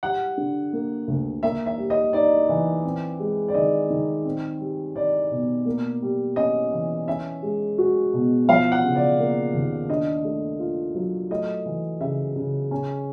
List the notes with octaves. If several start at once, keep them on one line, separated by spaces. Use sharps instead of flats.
G3 F#5
D3
A#3
D2
A#3 E5
E5
G3
D#5
D#4 D5
E3
C4
G#3
D5
D#3 D#5
D#3
C4
G3
D#4 D5
B2
A#3
G3
C#4 D#5
E3
C#4 E5
G#3
F#4
B2
F3 F5
F#5
C#3
D5
A#3
D#2
D4 D#5
A3
F4
F#3
A3 D#5
E3
C#3 E5
C#3
C#4